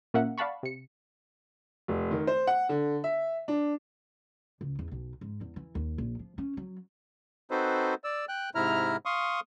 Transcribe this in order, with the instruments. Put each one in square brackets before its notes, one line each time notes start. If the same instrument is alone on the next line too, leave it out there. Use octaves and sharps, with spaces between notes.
[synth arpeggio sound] A#2 A#3 C#4 A#4 E5 F#5
D5 F5 F#5 A5 B5 C#6
C3 C#7
[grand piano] F1
D#3
C5
F#5
D3
E5
D4
[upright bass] C#2
E2
B1
G#2
E2
E3
D#2
A#1
F3
C#4
F#3
[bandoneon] C4 D#4 F#4 A4 B4 C5
D5 E6
G5 F#6
G#2 C3 E4 A#5 F6
F5 C6 C#6 D#6